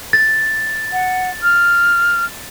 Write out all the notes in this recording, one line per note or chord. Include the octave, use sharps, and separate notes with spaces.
A6
F#5
F6